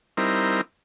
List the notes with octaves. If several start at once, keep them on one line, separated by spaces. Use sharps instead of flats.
G3 C4 D#4 E4 A#4